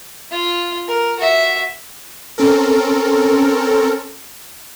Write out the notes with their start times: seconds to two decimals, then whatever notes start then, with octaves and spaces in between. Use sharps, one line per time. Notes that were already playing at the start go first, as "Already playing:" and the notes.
0.31 F4
0.88 A#4
1.19 F#4 E5
2.38 C4 C#4 A4 A#4